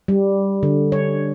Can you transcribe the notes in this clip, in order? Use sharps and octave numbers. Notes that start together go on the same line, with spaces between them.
G3
D3
C#5